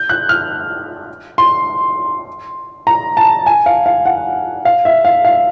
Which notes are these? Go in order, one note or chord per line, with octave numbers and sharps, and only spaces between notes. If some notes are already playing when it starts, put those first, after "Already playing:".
Already playing: G6
F#6
F6
C6
A#5
A5
G#5
F5
F5
F#5
F5
E5
F5
F5